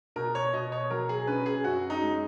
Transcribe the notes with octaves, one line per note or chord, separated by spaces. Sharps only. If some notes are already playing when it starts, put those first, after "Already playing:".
B2 A#4
C#5
B2 D#5
C#5
F#3 A#4
G#4
C#4 B4
G#4
F#2 F#4
D#4
G#3